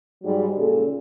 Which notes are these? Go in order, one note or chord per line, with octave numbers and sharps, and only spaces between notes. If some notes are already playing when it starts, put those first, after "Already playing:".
G#2 F#3 G3
A#2 C#3 A4